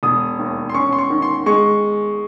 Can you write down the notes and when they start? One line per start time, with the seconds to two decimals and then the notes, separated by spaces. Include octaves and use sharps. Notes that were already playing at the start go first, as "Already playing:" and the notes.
0.03 E1 D#6
0.39 D#2
0.69 C6
0.74 C#4 C#6
0.92 C6
0.99 C#6
1.10 D#3
1.22 C6
1.46 G#3 C#6